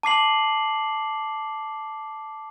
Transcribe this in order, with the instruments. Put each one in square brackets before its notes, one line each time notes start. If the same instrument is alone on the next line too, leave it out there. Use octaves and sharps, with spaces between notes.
[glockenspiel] A5 D6 C7 F#7